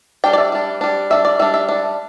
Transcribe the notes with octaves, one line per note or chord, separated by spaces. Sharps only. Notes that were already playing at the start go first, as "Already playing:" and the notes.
G3 D4 G5
D5
E5
G3 D4
G3 D4
G3 D4 E5
D5
G3 D4 E5
E5
G3 D4